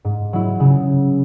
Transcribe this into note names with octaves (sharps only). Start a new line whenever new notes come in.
G#2
F#3 E4
C#3